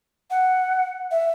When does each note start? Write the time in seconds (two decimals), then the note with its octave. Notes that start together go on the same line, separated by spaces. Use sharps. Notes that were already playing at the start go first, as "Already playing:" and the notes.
0.30 F#5
1.11 E5